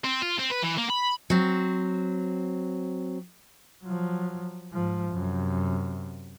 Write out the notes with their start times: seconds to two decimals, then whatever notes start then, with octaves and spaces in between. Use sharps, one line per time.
0.05 C4
0.22 F4
0.38 C4
0.50 B4
0.62 E3
0.77 A#3
0.89 B5
1.30 F#3 C4
3.84 F3 F#3
4.73 G#2 F3
5.13 F#2 C3